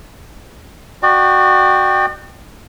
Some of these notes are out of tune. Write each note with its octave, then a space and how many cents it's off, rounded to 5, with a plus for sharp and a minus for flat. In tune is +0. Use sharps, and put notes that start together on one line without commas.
F#4 +0 D5 +45 G5 +0